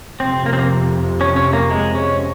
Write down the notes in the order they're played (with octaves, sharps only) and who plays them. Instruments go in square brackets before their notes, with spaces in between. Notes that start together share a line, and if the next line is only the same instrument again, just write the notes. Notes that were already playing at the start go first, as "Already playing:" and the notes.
[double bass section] F2 C3 F3 [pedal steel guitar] C4
[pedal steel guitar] A#3
C4
A#3
C#4
C#4
A#3
G#3
C#4